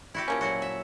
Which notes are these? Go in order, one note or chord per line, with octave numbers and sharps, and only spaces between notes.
E4 F#4 G4
F3 A#3 C#4
A#2 F#3 F#4
E5